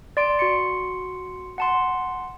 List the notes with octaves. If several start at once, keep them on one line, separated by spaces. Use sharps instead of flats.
D5 C6 D7
F#4 C6 C#7
F#5 A5 C6